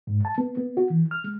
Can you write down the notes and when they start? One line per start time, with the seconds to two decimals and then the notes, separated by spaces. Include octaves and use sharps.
0.07 G#2
0.25 A5
0.38 B3
0.57 B3
0.77 F#4
0.90 E3
1.11 F6
1.24 G#3